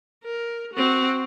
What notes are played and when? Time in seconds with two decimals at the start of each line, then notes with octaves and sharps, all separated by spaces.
0.25 A#4
0.74 C4 F#4